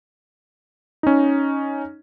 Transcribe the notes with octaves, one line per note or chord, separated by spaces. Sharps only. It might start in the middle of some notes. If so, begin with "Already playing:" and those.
C#4 D#4